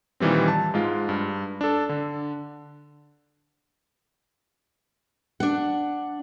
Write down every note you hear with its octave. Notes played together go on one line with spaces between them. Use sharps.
A#2 D#3 E3 G3 C4
A5
G#2 G#3 F4
G2
D4 A4
D3
D4 F#5